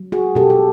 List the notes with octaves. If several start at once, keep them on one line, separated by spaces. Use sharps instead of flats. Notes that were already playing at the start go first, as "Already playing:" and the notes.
Already playing: F#3
F#4 G#4
B2 G4 A4
A4